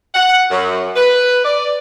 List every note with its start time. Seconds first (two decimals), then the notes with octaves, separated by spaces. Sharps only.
0.14 F#5
0.50 F#2
0.96 B4
1.45 D5